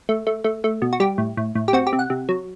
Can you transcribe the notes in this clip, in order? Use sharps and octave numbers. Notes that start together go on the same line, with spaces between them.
A3
A3
A3
A3
B2
F#4
G3 G4
A2
A2
A2
G4
C4 F#4
G4
C3
F#5
C3
F#3